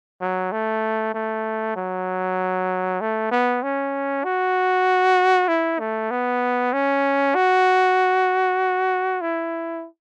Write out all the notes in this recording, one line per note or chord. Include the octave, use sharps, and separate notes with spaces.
F#3
A3
A3
F#3
A3
B3
C#4
F#4
E4
A3
B3
C#4
F#4
E4